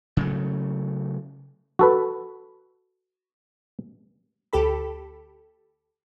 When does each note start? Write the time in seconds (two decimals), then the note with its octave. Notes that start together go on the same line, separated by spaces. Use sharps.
0.17 C#3 F#3 A3
1.79 F#4 A4 B4
4.53 D2 G4 A4 B5